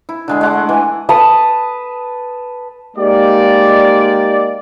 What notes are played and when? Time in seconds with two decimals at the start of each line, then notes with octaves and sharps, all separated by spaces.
0.09 E4
0.28 D3 G#3 C6
0.41 G#3 F#5 D6
0.53 A3
0.69 E3 G#5
1.09 B4 A5 D#6
2.97 G#3 A#3 D#4 G4 D5